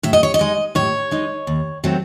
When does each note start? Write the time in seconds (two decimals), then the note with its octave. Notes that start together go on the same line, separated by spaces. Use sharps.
0.03 A2 E5
0.13 D#5
0.23 C#5
0.34 D#5
0.39 G#3 D#4
0.75 A2 C#5
1.11 G#3 D#4
1.47 D#2
1.84 D#3 F#3 A3 C4